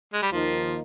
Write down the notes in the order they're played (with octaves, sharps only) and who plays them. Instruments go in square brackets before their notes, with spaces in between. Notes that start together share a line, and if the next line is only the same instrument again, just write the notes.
[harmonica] G#3
G3
[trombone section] D#2 D#3 A#3 D#4 [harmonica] F3